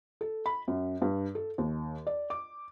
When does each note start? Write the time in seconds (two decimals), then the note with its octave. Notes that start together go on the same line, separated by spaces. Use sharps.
0.21 A4
0.46 B5
0.68 F#2
1.02 G2
1.35 A4
1.58 D#2
2.07 D5
2.30 D6